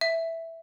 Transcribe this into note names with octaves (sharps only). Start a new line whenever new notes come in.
E5